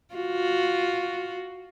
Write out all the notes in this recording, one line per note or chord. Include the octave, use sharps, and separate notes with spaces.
F4 F#4